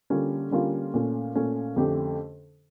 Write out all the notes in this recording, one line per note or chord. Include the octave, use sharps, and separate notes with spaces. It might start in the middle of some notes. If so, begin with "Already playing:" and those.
D3 G3 A#3 C#4 F4
D3 G3 A#3 C#4 F4
A#2 A3 C#4
A#2 A3 C#4
F2 D3 A3 C#4 G4